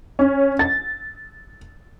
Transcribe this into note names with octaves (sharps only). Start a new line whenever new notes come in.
C#4
A6